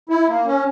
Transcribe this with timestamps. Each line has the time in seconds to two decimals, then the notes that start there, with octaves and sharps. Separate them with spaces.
0.09 E4
0.28 A#3
0.46 C#4